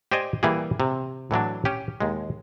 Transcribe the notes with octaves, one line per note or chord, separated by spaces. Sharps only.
G4 C5 D5 D#5 G#5
E3 G3 A#3 G4 G#4
C3
A2 E3 F#3 D4
C#4 G4
D#2 G#3